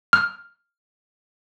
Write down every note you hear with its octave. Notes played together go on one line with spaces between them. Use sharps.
F6